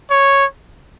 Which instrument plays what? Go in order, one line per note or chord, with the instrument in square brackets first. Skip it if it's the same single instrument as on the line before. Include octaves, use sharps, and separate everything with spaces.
[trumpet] C#5